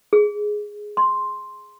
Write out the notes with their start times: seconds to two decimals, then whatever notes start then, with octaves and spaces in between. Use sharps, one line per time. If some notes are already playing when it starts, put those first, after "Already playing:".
0.13 G#4
0.97 C6